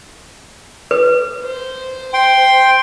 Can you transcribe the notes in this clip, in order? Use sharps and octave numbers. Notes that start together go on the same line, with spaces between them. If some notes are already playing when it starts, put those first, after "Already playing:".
B4
C5
G5 C6